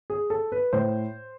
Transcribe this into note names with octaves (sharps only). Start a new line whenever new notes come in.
G#4
A4
B4
A2 C5